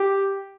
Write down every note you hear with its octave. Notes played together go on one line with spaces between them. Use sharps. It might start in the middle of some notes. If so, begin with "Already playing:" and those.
Already playing: G4